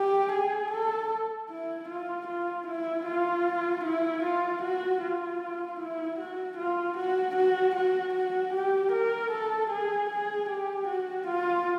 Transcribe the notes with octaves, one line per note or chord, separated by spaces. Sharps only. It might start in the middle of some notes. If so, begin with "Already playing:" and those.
Already playing: G4
G#4
A4
E4
F4
F4
E4
F4
E4
F4
F#4
F4
E4
F#4
F4
F#4
F#4
F#4
F#4
G4
A#4
A4
G#4
G#4
G4
F#4
F4